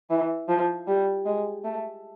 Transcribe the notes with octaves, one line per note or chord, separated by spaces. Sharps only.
E3
F3
G3
G#3
A3